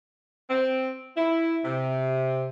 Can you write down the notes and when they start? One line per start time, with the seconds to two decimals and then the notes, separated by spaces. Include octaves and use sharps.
0.50 C4
1.17 E4
1.65 C3